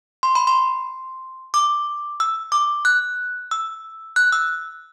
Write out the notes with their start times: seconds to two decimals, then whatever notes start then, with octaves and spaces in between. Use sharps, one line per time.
0.23 C6
0.35 B5
0.47 C6
1.54 D6
2.20 E6
2.52 D6
2.85 F#6
3.51 E6
4.16 F#6
4.32 E6